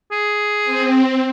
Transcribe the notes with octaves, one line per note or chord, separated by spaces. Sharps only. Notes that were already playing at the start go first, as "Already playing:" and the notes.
G#4
C4